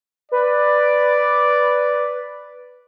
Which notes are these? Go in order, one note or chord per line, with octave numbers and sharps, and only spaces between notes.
B4 D5